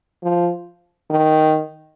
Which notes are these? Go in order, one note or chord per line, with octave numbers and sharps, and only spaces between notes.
F3
D#3